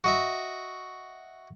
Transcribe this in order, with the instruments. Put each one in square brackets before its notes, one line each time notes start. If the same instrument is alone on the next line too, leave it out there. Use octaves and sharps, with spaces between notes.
[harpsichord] F#4 D#5 E5